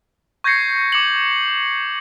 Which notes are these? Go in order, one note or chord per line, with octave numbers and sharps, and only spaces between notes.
C#6 G6 G#6 A#6 C7 C#7
D6 C#7 F#7